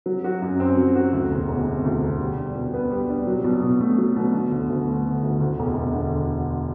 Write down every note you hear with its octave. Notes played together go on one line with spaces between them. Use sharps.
F#3
F#4
F#2
C4
F#3
F#4
D2
E1
E1
C3
D2
E1
G3
D4
B2
B3
G3
D4
F#3
B2
B2
A3
F#3
B2
D3
D2
D2
A3
D3
D2
D2
E1
E1
D3